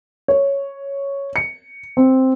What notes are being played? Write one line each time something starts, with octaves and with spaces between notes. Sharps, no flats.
C#5
C#7
C4